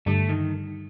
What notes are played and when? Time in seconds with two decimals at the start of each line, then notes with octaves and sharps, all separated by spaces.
0.06 G2 D3 G3 A3
0.29 D#3